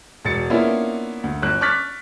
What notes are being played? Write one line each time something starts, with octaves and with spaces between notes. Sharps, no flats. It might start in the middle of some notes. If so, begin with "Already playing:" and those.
E1 B2 A6 C#7
A#3 B3 C#4 D4 E4 F4
D2
G1 F#6
C#6 D6 F6 F#6 A6 B6